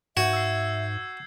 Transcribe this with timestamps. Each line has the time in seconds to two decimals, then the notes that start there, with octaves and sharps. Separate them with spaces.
0.17 G#2 F#4 E5 G6 G#6
0.33 E6 C7